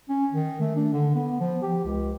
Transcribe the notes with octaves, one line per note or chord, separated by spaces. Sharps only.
C#4
D#3
A3
D4
D3
B3
F3
G4
C#2